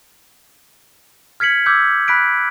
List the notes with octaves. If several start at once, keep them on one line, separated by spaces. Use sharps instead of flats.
F6 G#6 B6 C#7 F#7
D6 E6 F6 G6 G#6
B5 F#6 B6 D7